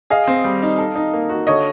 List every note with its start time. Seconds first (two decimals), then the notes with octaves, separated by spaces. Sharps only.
0.10 G#4 D#5 F5
0.28 C4
0.44 G3
0.63 D#4
0.78 A4
0.95 D#4
1.13 A#3
1.29 F#4
1.47 D3 C#5 D#5